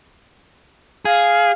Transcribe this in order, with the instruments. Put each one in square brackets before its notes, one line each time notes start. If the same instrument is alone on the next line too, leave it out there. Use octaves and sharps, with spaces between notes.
[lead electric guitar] G#4 [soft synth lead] F5